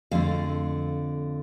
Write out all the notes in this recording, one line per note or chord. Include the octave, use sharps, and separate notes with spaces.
F2 D3 A3 F5